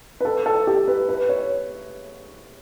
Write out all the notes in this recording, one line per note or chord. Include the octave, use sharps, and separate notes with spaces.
B4
A4
A4
G4
B4
B4
C#5